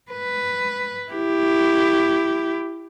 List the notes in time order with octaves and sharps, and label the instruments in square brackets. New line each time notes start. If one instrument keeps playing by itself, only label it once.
[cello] B4
E4 G4